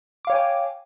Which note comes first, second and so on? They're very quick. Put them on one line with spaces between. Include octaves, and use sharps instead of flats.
D6 F5 C#5 G5 G#5